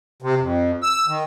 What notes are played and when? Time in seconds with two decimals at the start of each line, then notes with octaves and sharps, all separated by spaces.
0.22 C3
0.41 F2
0.83 E6
1.08 D#3